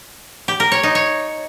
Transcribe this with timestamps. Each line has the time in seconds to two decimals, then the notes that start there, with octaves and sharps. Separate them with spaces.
0.48 G4
0.60 A#4
0.72 C#5
0.83 D#4
0.95 C#5